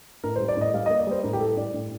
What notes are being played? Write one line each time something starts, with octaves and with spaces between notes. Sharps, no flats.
A2 A#4
C5
G3
D5
A2 D#5
G3 F5
D#5
A#3
D5
G3 C5
A2 A#4
G4
G3 A4
A2 D5
A2